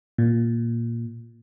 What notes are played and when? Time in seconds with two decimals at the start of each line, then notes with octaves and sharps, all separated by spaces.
0.18 A#2